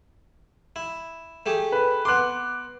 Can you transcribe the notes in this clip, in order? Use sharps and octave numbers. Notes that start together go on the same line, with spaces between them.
E4
A3 G4 G#4
B4
B3 C6 D6 F#6